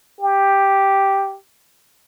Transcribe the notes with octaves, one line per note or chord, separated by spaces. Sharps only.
G4